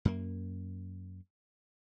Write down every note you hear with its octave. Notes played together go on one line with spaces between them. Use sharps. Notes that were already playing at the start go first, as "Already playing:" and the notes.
F#2 A#3